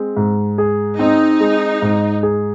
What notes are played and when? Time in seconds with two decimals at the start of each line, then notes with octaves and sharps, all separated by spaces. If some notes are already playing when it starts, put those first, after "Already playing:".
Already playing: G#3 C4
0.17 G#2
0.58 G#4
0.99 C4 D#4
1.40 G#3
1.82 G#2
2.23 G#4